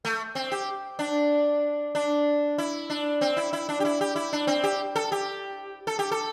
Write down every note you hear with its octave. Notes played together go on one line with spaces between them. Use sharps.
A3
C4
G4
D4
D4
E4
D4
C4
E4
E4
D4
G4
E4
G4
E4
D4
C4
G4
A4
G4
A4
G4
A4